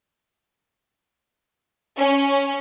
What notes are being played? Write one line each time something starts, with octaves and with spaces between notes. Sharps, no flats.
C#4